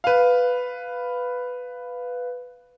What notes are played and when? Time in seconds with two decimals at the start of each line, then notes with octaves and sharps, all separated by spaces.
0.04 B4 F5